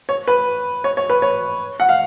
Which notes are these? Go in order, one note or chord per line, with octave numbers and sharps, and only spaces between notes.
C#5
B4
C#5
C#5
B4
C#5
F#5
F5